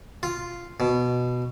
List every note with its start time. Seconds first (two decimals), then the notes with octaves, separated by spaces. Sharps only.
0.23 F4
0.80 B2